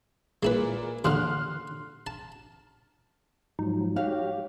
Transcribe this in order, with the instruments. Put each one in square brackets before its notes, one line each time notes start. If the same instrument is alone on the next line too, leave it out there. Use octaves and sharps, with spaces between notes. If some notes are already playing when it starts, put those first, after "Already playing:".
[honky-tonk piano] A#2 [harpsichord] G#3 E4 B4
[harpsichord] D#2 A#2 D3 [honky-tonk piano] C6 F6 F#6
[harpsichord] A5
[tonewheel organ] G#2 F3 F#3 [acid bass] D#4
[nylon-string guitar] F#4 C#5 F5 [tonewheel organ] G4